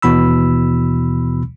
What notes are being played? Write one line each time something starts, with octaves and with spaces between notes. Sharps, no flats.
D#2 B2 E3 B5 E6